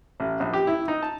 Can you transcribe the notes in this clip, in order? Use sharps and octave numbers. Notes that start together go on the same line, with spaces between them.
A1
A#1
G4
E4
D#4
A5